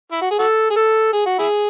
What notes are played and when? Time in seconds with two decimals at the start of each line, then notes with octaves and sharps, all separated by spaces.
0.12 E4
0.21 F#4
0.31 G#4
0.39 F#4 A4
0.70 G#4
0.76 A4
1.13 G#4
1.26 F#4
1.39 E4 G#4